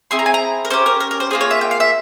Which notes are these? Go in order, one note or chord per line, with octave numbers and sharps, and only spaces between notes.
C4 E4 G#4 C6
A#5
G#5
A#5
A#4
C#4 G4 C5
A#4
A#4
A#4
C5
A#3 F4 G#4 C5
C#5
E5
G5
F5
E5